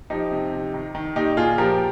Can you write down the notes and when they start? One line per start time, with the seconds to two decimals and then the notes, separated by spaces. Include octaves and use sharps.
0.10 F3 D#4 G4
0.31 C3
0.53 C3
0.74 D#3
0.95 D#3
1.16 A#2 D#4 G4
1.37 A#2 F4 G#4
1.58 F3 G4 A#4